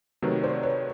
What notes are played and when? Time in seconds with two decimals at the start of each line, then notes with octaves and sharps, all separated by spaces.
0.22 C3 D#3 F#3 A3 B4 C#5
0.43 C5 D5
0.63 B4 C#5